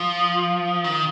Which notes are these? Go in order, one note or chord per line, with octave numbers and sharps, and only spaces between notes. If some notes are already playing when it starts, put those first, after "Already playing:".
Already playing: F3
D#3